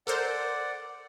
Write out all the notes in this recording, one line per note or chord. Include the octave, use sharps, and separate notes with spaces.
A4 A#4 C5 D5 F#5